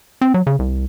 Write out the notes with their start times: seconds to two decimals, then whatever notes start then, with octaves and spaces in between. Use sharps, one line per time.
0.21 C4
0.34 F#3
0.47 C#3
0.59 C2